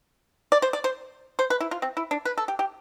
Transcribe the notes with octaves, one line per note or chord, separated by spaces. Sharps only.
D5
C5
D5
C5
C5
B4
E4
F4
C4
E4
D4
B4
A4
G4
G4